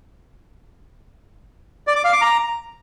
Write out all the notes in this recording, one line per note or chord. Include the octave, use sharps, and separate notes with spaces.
D5
D6
F5
D6
A#5